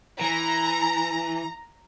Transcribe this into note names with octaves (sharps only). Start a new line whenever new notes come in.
E3 A#5